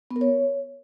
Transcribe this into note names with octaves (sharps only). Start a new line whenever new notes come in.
B3
A#4
C#5